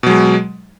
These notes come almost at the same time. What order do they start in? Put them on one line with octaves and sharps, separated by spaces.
B2 F#3 G#3